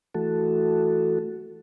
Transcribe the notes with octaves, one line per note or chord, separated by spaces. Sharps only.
E3 A3 F#4 A4